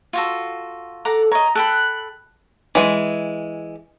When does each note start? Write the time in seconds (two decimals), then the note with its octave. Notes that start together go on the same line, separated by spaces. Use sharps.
0.13 F4 F#4 A4
1.05 A4 F#5 A#5 D6
1.32 C#5 D#5 A#5
1.55 A4 G5 B5 F#6
2.75 E3 G#3